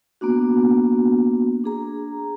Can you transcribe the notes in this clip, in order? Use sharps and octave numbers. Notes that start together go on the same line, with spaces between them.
A#3 B3 D4 F#4
D4 G#4 A#5